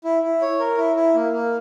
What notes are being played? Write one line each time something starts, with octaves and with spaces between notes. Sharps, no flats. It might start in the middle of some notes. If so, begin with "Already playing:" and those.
E4
E4
C#5
A#4
E4
E4
A#3
A#3